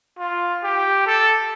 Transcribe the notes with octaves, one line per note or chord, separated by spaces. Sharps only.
F4
G4
A4